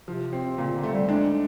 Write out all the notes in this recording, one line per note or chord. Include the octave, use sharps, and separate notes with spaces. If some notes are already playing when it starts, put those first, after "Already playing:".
C3 F3
C4
A#2 C#3
D3
A3
G3
G#3 D4